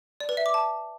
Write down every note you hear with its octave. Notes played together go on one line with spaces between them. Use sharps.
D5
B4
E5
D6
A5